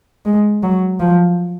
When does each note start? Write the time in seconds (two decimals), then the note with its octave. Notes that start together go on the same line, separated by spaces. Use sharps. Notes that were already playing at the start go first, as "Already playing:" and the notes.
0.25 G#3
0.63 F#3
1.00 F3